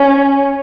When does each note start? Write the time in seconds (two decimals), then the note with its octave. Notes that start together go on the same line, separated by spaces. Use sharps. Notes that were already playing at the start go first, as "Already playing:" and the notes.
Already playing: C#4